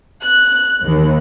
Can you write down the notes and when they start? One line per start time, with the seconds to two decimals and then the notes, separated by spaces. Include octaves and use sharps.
0.23 F#6
0.85 D#2